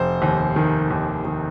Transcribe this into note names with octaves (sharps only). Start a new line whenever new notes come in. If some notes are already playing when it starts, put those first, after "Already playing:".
Already playing: F1 C5
D#2
D#3
D#2
D#3